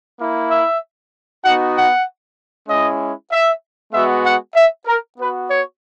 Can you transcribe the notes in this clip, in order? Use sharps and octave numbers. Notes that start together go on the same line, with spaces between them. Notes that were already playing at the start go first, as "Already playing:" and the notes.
A#3 E4
E5
B3 D#4 F#4 F#5
F#5
G#3 C#4 E4 D#5
E5
G#3 B3 F#4 E5
F#5
E5
A#4
B3 F#4 B4
C#5